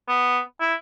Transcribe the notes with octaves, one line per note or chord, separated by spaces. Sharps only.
B3
E4